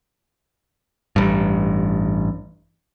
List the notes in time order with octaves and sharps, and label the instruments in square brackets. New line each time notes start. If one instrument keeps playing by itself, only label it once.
[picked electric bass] A1 G2